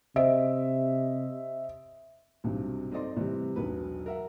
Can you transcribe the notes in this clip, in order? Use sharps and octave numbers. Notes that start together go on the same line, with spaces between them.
C3 C5 D#5 E5
B1 G2 C3 F#3
C4 D#4 A4 D5 D#5 C6
A2 C3 E3 G3
E1 B1 F#3 B4
A#4 E5 F#5